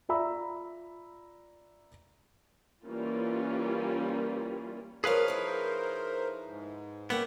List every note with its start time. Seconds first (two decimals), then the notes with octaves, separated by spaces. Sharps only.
0.09 F4 D5 E5 A#5 B5 E6
2.85 E3 G3 A#3 C#4 F4
5.04 F3 G4 G#4 A#4 B4 C#5 F5 F6
5.28 D#4 E4
5.45 A#4 C5
6.46 G#2
7.10 A#3 B3 C#4 G4 E5 F#5